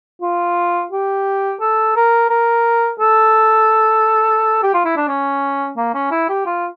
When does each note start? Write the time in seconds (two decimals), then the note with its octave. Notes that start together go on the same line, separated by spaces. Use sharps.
0.22 F4
0.92 G4
1.61 A4
1.96 A#4
2.30 A#4
3.00 A4
4.63 G4
4.74 F4
4.85 E4
4.97 D4
5.08 C#4
5.77 A#3
5.94 C#4
6.11 E4
6.29 G4
6.46 F4